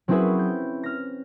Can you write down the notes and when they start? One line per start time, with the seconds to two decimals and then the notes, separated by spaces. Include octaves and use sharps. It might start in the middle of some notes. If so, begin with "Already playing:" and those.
0.08 F#3 C4 C#4 E4 G#4 B4
0.39 G6
0.83 F6 A#6